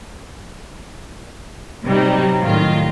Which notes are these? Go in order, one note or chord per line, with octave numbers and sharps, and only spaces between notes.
C3 F#3 G3 D#4
A2 D#3 F4